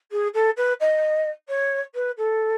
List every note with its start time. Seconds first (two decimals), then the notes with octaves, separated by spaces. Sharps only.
0.11 G#4
0.34 A4
0.56 B4
0.80 D#5
1.48 C#5
1.94 B4
2.17 A4